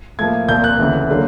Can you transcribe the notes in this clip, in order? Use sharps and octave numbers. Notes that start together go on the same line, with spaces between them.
A2 F3 A#3 G#6
C2 A#2 F3 G6
F#6
D2 C#3 E3
D3 F#3 A#3